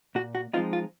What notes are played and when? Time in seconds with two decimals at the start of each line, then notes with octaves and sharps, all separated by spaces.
0.15 A#2 F#4
0.35 F#4
0.53 F3 G#3 C4 D#4 F4
0.73 F4